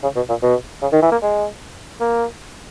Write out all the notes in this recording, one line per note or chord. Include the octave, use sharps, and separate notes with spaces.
C#3
B2
A#2
B2
C#3
D#3
E3
A#3
G#3
A#3